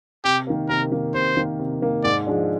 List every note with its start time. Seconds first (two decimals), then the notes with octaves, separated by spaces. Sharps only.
0.25 C3 G4
0.47 D#3 A#3
0.69 C3 A#4
0.92 D#3 A#3
1.14 C3 C5
1.37 D#3 A#3
1.59 C3
1.82 D#3 A#3
2.04 G#2 D5
2.27 F3 G#3 D4